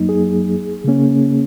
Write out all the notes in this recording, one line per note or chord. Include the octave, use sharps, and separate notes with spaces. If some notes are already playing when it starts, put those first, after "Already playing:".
Already playing: F#2 F#3 A#3 D#4
G#4
C#3 A#3 C#4